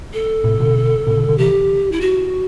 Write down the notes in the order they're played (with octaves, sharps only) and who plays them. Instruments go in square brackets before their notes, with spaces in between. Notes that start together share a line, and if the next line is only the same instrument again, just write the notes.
[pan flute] A4
[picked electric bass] A2 C3
B2 D3
A2 C3
B2 D3
B2 D3
[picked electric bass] C3 E3 [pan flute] G4
[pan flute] E4
F#4